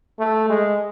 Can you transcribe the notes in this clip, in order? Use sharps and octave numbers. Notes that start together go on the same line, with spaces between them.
A3
G#3